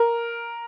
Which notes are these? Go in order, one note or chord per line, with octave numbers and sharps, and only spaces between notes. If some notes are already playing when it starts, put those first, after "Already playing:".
Already playing: A#4